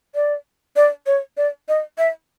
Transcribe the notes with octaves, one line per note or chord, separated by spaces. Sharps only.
D5
D5
C#5
D5
D#5
E5